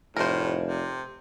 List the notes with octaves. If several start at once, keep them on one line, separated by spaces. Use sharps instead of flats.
F1 A2 A#4 C5
C3